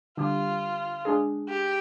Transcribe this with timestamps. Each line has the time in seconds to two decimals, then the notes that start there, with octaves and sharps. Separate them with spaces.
0.17 D3 G3 D4 F4 G4
1.05 G#3 D4 G#4
1.49 G4